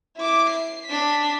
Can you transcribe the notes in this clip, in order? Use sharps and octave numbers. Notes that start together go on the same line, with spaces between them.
E4 D6
C7
D4 B6